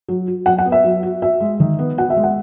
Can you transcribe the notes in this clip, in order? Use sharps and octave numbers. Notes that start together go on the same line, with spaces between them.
F#3
F#4
F#3 F#5
F#5
B3
E5
F#3
F#4
F#4 E5
G#3
D#3
B3
F#4 F#5
E5
G#3
F#5